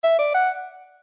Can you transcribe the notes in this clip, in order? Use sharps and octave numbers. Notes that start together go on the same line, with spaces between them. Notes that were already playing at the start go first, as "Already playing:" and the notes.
E5
D5
F#5